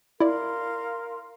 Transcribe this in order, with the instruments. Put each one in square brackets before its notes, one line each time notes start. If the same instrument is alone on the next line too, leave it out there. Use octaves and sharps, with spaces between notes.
[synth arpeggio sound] E4 D5 [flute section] A#4 F5 C6